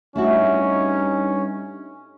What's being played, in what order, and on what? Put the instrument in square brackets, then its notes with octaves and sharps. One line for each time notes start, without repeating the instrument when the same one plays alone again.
[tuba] G2 [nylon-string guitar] A3 E4 F#4 [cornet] C#4 [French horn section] D#4